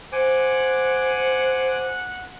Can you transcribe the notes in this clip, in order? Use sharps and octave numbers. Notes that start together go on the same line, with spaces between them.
C5 F#5 G#5 D6